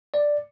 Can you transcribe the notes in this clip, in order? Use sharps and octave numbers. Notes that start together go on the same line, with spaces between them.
D5